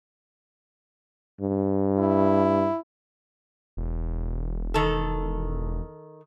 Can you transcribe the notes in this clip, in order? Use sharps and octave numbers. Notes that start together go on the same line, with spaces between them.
G2
E4
E1
D#3 A4